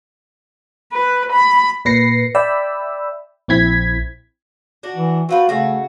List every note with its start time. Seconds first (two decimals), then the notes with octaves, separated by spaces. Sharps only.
0.93 B4
1.32 B5
1.85 A#2 B4 A#6 C7 C#7
2.35 D5 E5 G5 B5 E6
3.48 A#1 C4 E4 G#6 B6
4.83 D4 F#4
4.96 E3
5.29 C4 F4 F#4 B4
5.49 C#3 A3 F#4